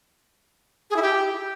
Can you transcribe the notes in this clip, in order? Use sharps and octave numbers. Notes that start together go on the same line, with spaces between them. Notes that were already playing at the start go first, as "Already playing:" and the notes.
G#4
E4
G4